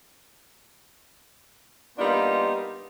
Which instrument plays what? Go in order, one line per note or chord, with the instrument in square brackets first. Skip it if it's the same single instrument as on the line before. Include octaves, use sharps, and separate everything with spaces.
[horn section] G3 A#3 B3 D4 D#4 F4